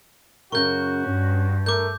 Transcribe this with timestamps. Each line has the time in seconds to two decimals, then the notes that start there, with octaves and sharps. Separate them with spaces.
0.52 F#2 C#3 F#4 A#4 C#6 G6
1.04 G2 C#4
1.66 A3 A#4 D6 G6